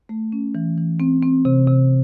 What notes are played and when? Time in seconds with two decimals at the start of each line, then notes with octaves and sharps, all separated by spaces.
0.09 A3
0.32 C#4
0.55 E3
0.77 E3
1.00 C4
1.22 C4
1.45 C3
1.67 C3